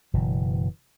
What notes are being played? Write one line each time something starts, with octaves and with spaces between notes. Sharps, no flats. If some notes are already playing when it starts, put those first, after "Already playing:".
F#1 B2 E3